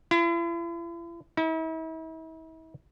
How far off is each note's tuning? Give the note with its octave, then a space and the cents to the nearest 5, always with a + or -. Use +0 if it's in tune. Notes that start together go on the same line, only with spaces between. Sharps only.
E4 +45
E4 -40